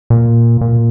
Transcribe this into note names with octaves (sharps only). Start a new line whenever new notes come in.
A#2
A#2